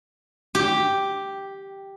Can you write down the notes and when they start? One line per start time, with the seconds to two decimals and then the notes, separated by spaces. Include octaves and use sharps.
0.55 G4